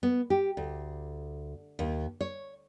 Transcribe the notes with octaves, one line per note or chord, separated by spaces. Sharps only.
B3
G4
D2
D#2
C#5